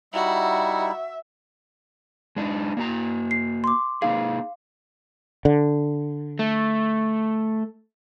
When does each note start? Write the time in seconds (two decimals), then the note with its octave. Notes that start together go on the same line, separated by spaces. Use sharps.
0.13 G3 D#4 E4 F#4 E5
2.36 G#3 D4 D#4
2.77 A#3 F#4 A#5
3.31 C7
3.64 C6 D6
4.02 A#3 D#4 G#4 F5
5.45 D3
6.39 A3